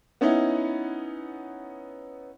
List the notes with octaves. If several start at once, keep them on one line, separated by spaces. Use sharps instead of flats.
B3 C#4 D#4 E4